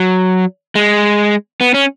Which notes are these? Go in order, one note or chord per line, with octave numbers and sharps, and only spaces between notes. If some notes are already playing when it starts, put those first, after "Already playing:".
Already playing: F#3
G#3
B3
C#4